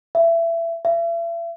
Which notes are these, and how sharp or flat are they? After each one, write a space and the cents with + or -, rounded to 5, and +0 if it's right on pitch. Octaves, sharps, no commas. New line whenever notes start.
E5 +25
E5 +40